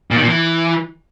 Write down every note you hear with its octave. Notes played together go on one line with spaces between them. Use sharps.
A#2
D#3
A#2
E3